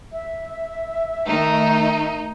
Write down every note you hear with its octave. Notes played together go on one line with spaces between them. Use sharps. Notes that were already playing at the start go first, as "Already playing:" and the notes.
E5
D#3 A3 D#4